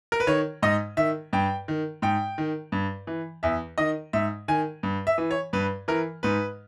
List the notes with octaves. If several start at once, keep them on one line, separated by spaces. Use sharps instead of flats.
A#4
B4
D#3 C#5
G#2 D#5
D#3 E5
G2 G5
D#3
G#2 G5
D#3
G2
E3
E2 E5
D#3 D#5
G#2 E5
D#3 G#5
G2
E5
E3
C#5
G2 B4
E3 A#4
G#2 B4